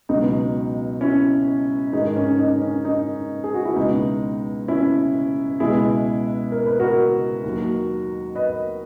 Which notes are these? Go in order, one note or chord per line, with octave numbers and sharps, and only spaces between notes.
C#2 B2 F#3 D#4
C#4 E4
G#2 D#3 G#3 D#4
C#4
D#4
C#4
D#4
G#4
F#4
E4
C#2 B2 G#3 D#4
C#4 E4
C#2 B2 G#3 E4 G#4
A#4
B4
F#4 A#4
D#2 D#3 F#3
B4 D#5